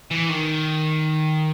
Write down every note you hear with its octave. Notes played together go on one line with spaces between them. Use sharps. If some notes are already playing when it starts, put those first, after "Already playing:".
E3
D#3